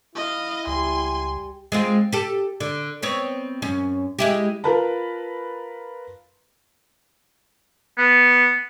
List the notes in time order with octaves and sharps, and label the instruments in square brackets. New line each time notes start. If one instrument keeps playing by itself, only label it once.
[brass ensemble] E4 [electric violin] D#5 F5
[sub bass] C#2 [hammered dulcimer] G3 [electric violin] G#5 C6
[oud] G#3 C4 F4
G4 A4
D3
B3 C4 C#5
F#2 C#4
G#3 E4 G4
[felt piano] F4 A#4 B4 A5 A#5
[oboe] B3